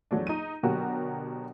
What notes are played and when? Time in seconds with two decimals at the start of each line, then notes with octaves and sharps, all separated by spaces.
0.11 E2 F#3 A3 D4
0.27 D#4 D#7
0.63 B2 D3 F#3 F#4 G4 A#4